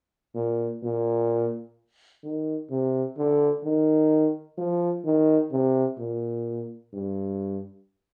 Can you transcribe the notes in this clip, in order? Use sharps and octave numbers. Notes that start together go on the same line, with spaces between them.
A#2
A#2
D#3
C3
D3
D#3
F3
D#3
C3
A#2
G2